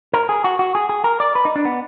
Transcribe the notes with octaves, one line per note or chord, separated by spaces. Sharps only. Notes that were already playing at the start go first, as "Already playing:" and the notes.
A#4
G#4
F#4
F#4
G#4
G#4
A#4
D5
B4
D#4
D4
B3